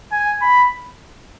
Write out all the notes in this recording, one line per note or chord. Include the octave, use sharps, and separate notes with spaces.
G#5
B5